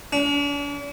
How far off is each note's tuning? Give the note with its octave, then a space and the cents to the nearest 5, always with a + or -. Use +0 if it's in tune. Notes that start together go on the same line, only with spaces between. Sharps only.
D4 -45